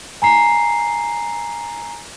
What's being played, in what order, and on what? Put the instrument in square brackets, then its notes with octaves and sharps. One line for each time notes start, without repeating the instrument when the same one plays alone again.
[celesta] G#5 A#5 C7